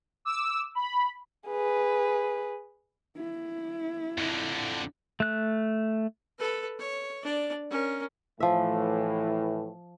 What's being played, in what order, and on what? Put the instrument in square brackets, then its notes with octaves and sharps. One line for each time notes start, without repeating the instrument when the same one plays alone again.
[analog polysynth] D6 E6
B5
[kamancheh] G#4 B4
[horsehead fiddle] E4
[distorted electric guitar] F2 D3
[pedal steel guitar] A3 F#6
[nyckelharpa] A4 B4
C#5
D4 D5
C#4 A#4
[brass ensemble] A2 E3 [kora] F3 E5